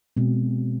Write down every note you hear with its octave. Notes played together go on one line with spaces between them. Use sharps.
B2 G#3 C4